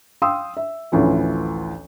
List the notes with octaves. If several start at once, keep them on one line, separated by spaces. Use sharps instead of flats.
F5 G5 C6 D#6 E6
E5
A1 D2 E3 F3